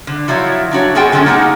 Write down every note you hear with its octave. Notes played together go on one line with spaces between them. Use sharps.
D3
F3 F#3 E4 C#5
F#3 D4 F#4 C#5
B3 F4 F#4 G#4 F#5 G5
D3 F#3 G#3 A#3 C#4
A#3 D#4 G#4 F#5